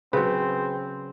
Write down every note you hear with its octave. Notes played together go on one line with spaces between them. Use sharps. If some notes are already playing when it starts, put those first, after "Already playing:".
C#3 F#3 C4 B4